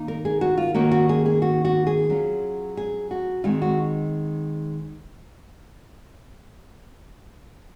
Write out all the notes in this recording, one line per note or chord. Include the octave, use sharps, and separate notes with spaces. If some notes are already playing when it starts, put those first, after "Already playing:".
Already playing: D#3 A#3 D#4
A#4
G#4
F#4
F4
D#3 A#3 C#4 F#4
F#4
G#4
G#4
F#4
F#4
G#4
F#3 C#4 F4
G#4
F#4
D#3 G#3 C4 D#4 F4
F#4